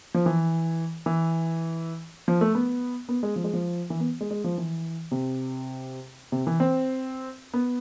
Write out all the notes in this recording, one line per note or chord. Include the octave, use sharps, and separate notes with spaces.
F3
E3
E3
F3
A3
B3
B3
G#3
F3
G#3
F3
E3
B3
G#3
G#3
F3
E3
C3
C3
E3
C4
B3